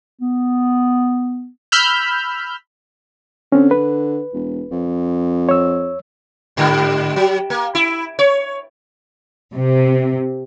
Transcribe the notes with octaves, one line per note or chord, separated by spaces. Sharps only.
B3
B5 E6 F6 G6
D3 C4 C#4
B4
E1
F2
C#5 E6
G#2 D3 G3
F#3
A#3
E4
C#5
C3